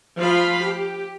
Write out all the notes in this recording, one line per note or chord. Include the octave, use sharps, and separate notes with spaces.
F3 F4 F5 B5
G4